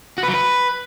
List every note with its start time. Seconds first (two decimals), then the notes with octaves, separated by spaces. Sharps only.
0.18 F#4
0.23 B4
0.28 F#3
0.33 B4